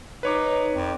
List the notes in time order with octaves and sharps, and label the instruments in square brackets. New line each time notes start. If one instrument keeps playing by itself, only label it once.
[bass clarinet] D#4 [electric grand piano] B4 C#5 D6
[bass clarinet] F2